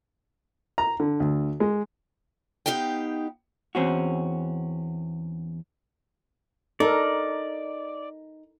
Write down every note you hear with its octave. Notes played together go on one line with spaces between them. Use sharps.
A#5
D3
D2
G#3
B3 D#4 G4 F5 G5
E2 C4 C#4 F#4
D#4 A4 A#4 D5